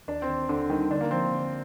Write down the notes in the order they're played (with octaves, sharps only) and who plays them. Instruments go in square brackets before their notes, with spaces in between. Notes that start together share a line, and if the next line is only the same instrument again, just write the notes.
[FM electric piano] D#2 [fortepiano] D4
[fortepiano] C4
[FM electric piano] D#3
[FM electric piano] D#2 [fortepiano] D3
[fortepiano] D#3 [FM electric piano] G3
[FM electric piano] D3 [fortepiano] D4
[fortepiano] A#3
[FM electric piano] F3 [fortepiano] C4
[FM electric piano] D3